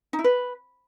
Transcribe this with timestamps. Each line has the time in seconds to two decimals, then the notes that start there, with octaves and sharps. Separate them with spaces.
0.13 D#4
0.19 E4
0.24 B4